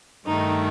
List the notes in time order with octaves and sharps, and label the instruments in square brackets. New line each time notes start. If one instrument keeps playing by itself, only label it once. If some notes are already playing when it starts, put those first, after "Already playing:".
[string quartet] G2 D#3 A3 D#4